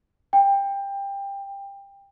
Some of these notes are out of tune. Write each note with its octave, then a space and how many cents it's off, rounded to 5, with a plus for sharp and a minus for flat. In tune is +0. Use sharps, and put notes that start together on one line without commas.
G5 +20